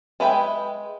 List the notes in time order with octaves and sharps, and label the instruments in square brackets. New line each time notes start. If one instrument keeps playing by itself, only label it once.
[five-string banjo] G#3 B4 E5 G5